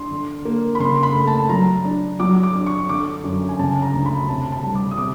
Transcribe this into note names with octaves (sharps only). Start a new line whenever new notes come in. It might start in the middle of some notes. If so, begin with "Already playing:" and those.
Already playing: D4 C6
D3
A#3
B5
C#3 C6
B5
A3
A5
F#3 A#5
D4
F#3 D6
D6
D4
C#6
D3 D6
F#2
G#5
C#3 A5
A#5
D2
B5
C3 A5
A5
G3
D6
D#6
C3 D6